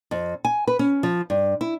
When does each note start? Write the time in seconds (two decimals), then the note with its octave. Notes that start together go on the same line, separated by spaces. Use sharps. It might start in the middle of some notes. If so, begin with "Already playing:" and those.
0.11 F2
0.45 G#5
0.67 B4
0.79 C#4
1.03 F3
1.30 G2
1.61 E4